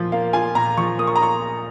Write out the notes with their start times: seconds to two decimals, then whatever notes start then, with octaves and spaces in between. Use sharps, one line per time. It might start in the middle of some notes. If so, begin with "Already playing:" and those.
Already playing: A#2 F3 F4
0.12 A#3 F5
0.33 F4 G#5
0.55 A#2 A#5
0.77 F3 C#6
0.98 A#3 D#6
1.07 C#6
1.16 A#5
1.21 F4 C#6